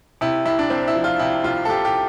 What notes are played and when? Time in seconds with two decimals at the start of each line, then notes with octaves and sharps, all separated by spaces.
0.21 C3 E4
0.46 C2 E4
0.59 D4
0.70 C2 C4
0.88 E4
0.95 F3
1.04 F4
1.19 C3 E4
1.44 C2 F4
1.65 A4
1.69 C2 G4
1.85 G4